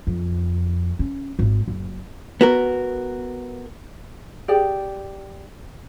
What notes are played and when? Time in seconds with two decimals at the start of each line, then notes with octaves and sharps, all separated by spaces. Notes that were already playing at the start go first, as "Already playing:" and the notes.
0.07 F2
0.99 C#4
1.39 G#1
1.68 F#1
2.41 B3 F#4 A#4
4.48 G4 G#4 D5 G5